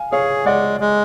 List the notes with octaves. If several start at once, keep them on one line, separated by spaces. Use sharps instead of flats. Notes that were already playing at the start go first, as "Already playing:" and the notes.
Already playing: F5 G#5
G#4 C#5 F5
G#3 D5 F#5
G#3